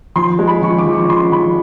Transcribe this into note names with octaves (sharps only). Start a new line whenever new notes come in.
F3 C6
G#3
B5
F3 C#6
D6
F3
C#6
F3 C6
F3 B5